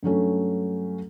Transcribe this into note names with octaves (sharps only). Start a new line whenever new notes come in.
G2 F#3 A3 C#4